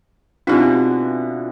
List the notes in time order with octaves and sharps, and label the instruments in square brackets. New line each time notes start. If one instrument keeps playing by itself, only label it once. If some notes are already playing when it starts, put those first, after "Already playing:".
[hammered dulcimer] B2 D3 E3 [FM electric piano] C4 F4 [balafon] D4 D#4 G4